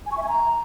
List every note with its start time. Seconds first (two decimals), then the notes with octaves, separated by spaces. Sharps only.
0.06 G#5
0.12 C#6
0.17 E5
0.23 G#5
0.29 A#5